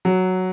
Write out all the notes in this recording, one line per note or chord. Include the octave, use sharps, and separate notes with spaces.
F#3